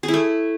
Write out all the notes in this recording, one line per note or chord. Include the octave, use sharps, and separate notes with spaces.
G#4
E4
A3